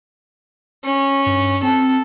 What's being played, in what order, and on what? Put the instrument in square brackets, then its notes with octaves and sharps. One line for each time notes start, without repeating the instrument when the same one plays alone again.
[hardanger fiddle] C#4
[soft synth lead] G2
[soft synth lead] C4 [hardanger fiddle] A4